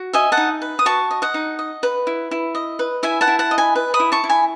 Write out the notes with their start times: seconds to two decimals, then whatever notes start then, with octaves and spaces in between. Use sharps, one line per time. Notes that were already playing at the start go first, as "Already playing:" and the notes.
Already playing: F#4
0.13 D#5 E5 G#5
0.32 F#5 A5
0.37 D#4
0.62 B4
0.79 D#6
0.86 F#4 A5 C#6
1.11 D#5
1.22 D#5 F#5
1.34 D#4
1.59 D#5
1.83 B4
2.07 E4
2.31 E4
2.55 D#5
2.79 B4
3.03 E4 E5 G#5
3.21 F#5 A5
3.27 E4
3.39 F#5 A5
3.51 D#5
3.58 G#5 B5
3.76 B4
3.94 B5 D#6
4.00 E4
4.12 A5 C#6
4.24 E4
4.29 G#5 B5